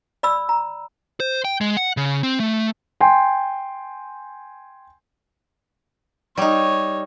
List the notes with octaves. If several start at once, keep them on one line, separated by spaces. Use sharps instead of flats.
D5 B5 E6
A#5
C5
G5
G#3
F#5
C#3
C4
A3
G5 G#5 C6
G3 D#4 C#5